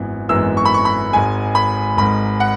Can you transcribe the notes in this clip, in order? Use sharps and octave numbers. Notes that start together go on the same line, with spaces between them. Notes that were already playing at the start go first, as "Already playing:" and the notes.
Already playing: G#1 F#2 E3 G#3 B3
G#1 F#2 E3 G#3 B3 E6
C#6
B5
C#6
B5
G#1 G#2 G#3 G#5
B5
G#1 G#2 G#3 B5
F#5